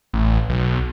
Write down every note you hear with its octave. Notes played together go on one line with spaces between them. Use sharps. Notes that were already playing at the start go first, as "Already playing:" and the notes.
A1
B1